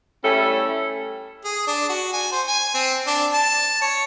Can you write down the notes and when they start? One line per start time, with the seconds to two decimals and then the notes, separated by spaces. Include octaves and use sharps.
0.23 G3 A3 C#4 E4 A4
1.45 G#4
1.67 D4
1.89 F#4
2.13 G#5
2.32 C5
2.47 G#5
2.74 C4
3.07 D4
3.34 A5
3.81 C#5